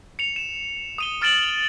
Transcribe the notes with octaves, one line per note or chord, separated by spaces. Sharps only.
C#7 F7
E7
D#6 D#7 G7
D#6 F6 A6 D7 E7 F#7